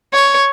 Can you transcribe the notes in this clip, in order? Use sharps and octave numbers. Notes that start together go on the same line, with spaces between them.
C#5